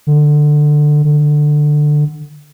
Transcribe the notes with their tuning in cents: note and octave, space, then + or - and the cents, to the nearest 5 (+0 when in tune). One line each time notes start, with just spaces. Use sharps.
D3 +15
D3 +15